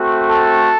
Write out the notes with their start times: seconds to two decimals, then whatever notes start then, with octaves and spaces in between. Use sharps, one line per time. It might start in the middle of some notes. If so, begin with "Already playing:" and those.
Already playing: A3 C4 F#4
0.30 A4